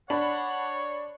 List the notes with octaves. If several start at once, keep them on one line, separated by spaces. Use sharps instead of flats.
D4 C#5 F#5 B5